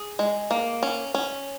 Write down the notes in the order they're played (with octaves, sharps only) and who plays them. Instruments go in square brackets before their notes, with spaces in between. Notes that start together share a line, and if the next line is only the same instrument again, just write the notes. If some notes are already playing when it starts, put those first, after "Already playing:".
Already playing: [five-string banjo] G#4
G#3
A#3
C#4
C#4